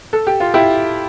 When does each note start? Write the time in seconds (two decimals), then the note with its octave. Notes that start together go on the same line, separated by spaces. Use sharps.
0.13 A4
0.27 G4
0.40 F4
0.54 E4 G4